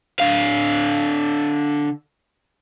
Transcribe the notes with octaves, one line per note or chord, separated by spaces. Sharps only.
D3 F5